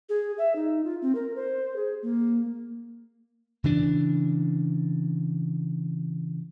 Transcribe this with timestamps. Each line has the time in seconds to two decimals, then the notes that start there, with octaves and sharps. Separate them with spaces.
0.09 G#4
0.38 E5
0.56 D#4
0.85 F4
1.02 C4
1.15 A#4
1.36 C5
1.76 G#4
2.03 A#3
3.64 C#3 E3 D4